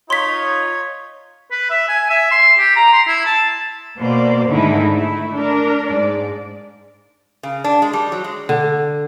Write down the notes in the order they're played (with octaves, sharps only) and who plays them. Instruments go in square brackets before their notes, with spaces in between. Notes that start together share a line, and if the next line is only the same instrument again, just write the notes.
[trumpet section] D#4 F4 [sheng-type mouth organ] C#5 [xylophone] C6 B6
[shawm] B4
E5
G#5
E5
C6
G4
A#5
C6
E4
A5
[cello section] B2 A#3 C5 D5
G#2 D3 D#3 A3 D#4 E4
A3 E4
D4 A#4
G#2 D5
[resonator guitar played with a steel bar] C#3
D4
G#3
G3
F#3
G#3
[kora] D3